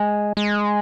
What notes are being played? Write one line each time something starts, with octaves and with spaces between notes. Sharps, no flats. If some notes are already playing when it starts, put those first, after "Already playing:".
Already playing: G#3
G#3